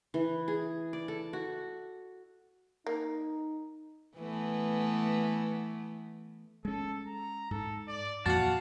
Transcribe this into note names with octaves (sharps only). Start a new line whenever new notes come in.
E3
G#4
D5
A4
F#4
A#3 D#4
E3 A3 B3
G#3 C#4 A4
A#5
G#2 A4
D5
F2 A#2 E3 F#4 F5 F#5 A5